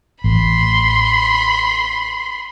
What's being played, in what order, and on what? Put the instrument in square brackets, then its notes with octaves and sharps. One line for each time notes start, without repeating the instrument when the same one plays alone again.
[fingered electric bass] A1 [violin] B5 C6